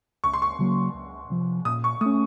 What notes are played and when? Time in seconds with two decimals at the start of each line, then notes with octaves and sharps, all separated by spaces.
0.24 C#2 C#6
0.33 C6
0.42 C#6
0.59 C#3 F#3 A#3
0.95 C#2
1.30 C3 F3
1.65 A#2 D#6
1.84 C#6
2.01 A3 C#4 D#6